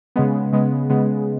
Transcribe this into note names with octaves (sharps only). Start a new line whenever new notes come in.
C#3 G#3 B3
C#3 G#3 B3
C#3 G#3 B3